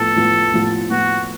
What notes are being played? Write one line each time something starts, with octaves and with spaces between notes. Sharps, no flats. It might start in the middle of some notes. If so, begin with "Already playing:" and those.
Already playing: A2 F3 B3 A4
A2 F3 B3
A2 F3 B3
A2 F3 B3 F#4